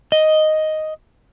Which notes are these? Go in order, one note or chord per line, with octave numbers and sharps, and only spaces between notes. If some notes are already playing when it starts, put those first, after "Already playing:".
D#5